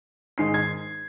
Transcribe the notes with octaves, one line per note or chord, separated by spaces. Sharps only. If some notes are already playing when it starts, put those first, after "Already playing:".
G#2 D#3 G#3 D#4 C7
G#6